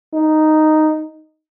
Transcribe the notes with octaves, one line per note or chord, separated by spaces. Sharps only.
D#4